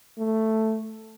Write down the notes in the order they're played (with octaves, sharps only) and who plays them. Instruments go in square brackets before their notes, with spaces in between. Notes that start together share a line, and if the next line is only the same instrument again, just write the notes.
[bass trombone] A3